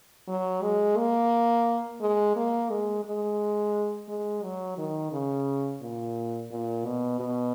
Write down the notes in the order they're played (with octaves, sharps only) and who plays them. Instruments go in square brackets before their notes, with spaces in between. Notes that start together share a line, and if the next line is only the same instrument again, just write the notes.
[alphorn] F#3
G#3
A#3
G#3
A#3
G#3
G#3
G#3
F#3
D#3
C#3
A#2
A#2
B2
B2